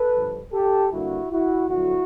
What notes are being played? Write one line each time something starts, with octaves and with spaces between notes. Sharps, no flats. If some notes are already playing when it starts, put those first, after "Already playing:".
Already playing: A4 B4
G2 D3 F3
G4 A4
G2 D3 G3 A#3 E4 F#4
E4 F#4
F2 D3 F#3 E4 F#4